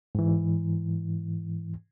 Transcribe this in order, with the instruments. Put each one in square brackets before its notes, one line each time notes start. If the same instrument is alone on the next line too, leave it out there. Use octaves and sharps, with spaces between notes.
[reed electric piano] G#2 E3